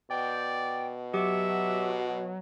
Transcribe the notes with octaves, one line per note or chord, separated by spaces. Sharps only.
B2 D5 G5
F#3 G4 E5 D6